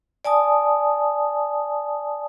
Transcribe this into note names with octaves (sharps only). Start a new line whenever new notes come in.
D5 G#5 A5 D#6